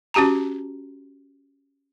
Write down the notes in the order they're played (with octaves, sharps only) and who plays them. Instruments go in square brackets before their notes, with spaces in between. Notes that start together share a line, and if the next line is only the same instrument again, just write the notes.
[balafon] C#4 F#4 G4 A5 A#5